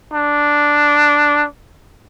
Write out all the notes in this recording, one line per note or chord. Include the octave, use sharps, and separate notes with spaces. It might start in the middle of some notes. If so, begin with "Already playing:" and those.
D4